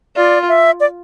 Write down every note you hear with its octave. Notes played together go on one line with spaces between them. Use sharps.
F4 D5
E5
D5